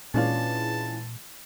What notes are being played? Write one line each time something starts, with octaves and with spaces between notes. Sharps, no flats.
A#2 E3 G#3 C#4 D4 F4 A5